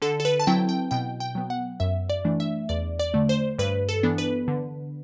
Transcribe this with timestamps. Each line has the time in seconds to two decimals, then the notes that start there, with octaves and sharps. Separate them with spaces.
0.02 D3 A4
0.20 A4
0.25 B4
0.40 A5
0.47 F#3 C4 E4 G5
0.69 G5
0.91 B2 G5
1.20 G5
1.35 F#3 B3
1.50 F#5
1.80 F#2 E5
2.10 D5
2.25 E3 A3 D4
2.40 E5
2.69 E2 D5
2.99 D5
3.14 D3 A3
3.29 C5
3.59 G2 B4
3.89 A4
4.03 E3 B3 D4
4.18 B4
4.48 D3